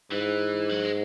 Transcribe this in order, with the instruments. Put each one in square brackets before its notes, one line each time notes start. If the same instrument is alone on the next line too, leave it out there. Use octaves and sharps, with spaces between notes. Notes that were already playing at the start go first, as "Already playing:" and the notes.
[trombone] G#2 [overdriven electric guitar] E3
[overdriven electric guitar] F#3
G#3